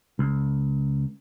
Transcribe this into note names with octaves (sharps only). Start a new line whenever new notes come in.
C#2